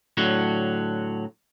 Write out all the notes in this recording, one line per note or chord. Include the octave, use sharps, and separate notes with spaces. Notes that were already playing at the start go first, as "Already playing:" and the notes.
A2 D3 F#3 F#4